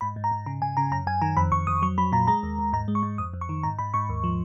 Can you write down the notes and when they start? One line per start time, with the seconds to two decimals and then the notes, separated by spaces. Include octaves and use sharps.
0.01 G#2 B5
0.16 G#2
0.24 A#5
0.31 G#2
0.46 C#3 A#5
0.62 C#3 G#5
0.77 C#3 A#5
0.92 F#2 A#5
1.07 F#2 G#5
1.22 D#3 A#5
1.37 F2 B5
1.52 F2 C#6
1.67 F2 D#6
1.82 F#3 C#6
1.98 F#3 B5
2.12 A#2 A#5
2.27 G#3 A#5
2.43 D#2
2.59 D#2
2.73 G#2 A#5
2.88 G#3
2.95 C#6
3.03 G#2
3.18 F2 D#6
3.34 F2
3.41 C#6
3.49 D#3
3.63 G#2 A#5
3.79 G#2 B5
3.94 G#2 C#6
4.09 D#2
4.24 F3